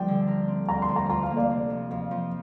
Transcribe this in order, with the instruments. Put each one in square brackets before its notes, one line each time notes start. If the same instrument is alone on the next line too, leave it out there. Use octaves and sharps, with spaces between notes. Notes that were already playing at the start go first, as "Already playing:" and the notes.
Already playing: [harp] D2 F3 G3 C4 [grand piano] G5
[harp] D3
A#4
C4
[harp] D3 [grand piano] A#5
[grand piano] C6
[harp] D2
[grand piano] A#5
[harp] F4 [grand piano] A#5
[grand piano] F5
[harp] A#3
[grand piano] D5
[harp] C3
F2
[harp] F2 [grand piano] F5
[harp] F3